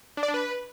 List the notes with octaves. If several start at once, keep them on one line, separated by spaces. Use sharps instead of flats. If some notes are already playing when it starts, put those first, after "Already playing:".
D4
D5
D4
B4